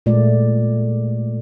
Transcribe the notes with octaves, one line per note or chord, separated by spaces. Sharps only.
A#2 G#3 A3 D5